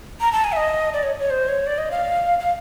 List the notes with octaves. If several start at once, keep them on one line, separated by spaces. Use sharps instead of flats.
A#5
A5
G#5
E5
D#5
D5
C#5
C#5
C5
C#5
D5
D#5
F5
F5